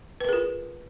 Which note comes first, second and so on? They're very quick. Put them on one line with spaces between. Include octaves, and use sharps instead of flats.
B4 A#4 G#4 F4